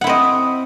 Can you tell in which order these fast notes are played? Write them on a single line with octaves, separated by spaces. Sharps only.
F#5 E4 C4 D#5